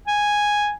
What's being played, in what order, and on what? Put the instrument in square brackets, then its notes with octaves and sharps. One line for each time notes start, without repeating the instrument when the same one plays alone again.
[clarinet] G#5